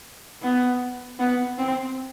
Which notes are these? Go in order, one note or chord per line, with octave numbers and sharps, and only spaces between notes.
B3
B3
C4